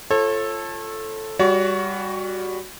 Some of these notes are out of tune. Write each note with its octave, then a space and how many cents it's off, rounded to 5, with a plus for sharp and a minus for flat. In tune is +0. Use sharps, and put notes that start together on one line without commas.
F4 -20 A4 +0 C#5 -35
G3 +15 F#4 +0 C#5 +45